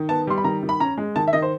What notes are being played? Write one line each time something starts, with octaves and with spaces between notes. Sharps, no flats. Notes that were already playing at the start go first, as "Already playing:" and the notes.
Already playing: D#3
B3 A5
G3 C6
B5
D#3 A#5
D#3
B5
C#4 A#5
G#3
D#3 A5
E5
D#3 D#5
C5